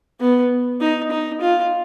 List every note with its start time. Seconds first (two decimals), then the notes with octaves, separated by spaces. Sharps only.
0.20 B3
0.81 D#4
1.11 D#4
1.41 F4